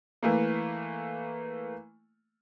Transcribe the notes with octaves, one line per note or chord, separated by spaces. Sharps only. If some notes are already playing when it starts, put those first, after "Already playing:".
E3 A3 A#3